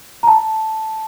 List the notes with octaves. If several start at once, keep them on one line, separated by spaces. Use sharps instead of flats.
A#5
A5